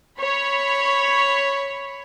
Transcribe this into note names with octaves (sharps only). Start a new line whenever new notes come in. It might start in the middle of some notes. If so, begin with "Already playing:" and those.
C#5 B5